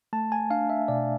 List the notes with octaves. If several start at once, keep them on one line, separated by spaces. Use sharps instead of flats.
A3 A5
G#5
D4 F5
E5
B2 D5